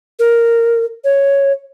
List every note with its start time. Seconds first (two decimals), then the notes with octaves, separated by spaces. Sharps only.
0.19 A#4
1.04 C#5